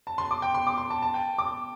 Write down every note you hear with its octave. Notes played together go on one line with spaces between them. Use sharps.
A5
C6
D6
G5
C6
D6
C6
A5
A5
G5
D6